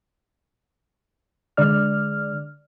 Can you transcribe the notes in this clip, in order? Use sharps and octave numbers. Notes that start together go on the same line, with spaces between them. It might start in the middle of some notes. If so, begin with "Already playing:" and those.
D3 G#3 D5 F6